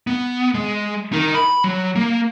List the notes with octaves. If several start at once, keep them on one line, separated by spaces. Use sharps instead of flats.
B3
G#3
D#4 A#4
B5
F#3
A#3